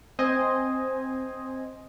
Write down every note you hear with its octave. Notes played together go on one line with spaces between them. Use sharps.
C4 C5 D#5 G#5